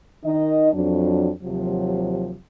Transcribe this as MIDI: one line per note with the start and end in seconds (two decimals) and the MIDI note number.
0.24 0.71 51
0.24 0.71 63
0.24 0.71 75
0.73 1.30 41
0.73 1.30 54
0.73 1.30 62
1.43 2.34 39
1.43 2.34 48
1.43 2.34 53
1.43 2.34 54